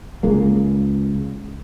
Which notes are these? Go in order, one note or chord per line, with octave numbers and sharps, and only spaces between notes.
C#2 G#3 A#3